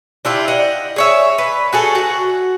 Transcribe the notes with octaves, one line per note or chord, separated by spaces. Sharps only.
D4 E4 F4 G4
D#5 F#5
G#4 C#5 E5
B4
F#4 G#4 A4
F#4 F#5